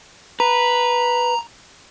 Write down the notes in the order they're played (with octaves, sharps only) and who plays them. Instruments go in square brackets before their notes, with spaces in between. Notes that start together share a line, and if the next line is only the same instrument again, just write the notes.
[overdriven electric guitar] B4 [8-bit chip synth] A#5